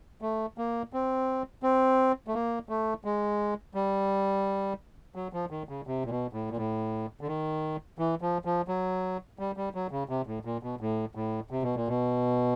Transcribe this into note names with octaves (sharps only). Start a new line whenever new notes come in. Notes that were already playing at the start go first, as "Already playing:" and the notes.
A3
A#3
C4
C4
A3
A#3
A3
G#3
G3
F#3
F3
D#3
C#3
C3
A#2
B2
A2
A#2
A2
D3
D#3
E3
F3
F3
F#3
G3
G3
F#3
C#3
C3
A2
A#2
B2
A2
A2
C3
B2
A#2
B2